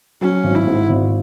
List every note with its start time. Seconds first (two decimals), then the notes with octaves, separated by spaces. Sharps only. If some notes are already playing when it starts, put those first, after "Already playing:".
0.21 F#3 C#4
0.44 G#1
0.55 E4
0.67 G#2
0.89 G#1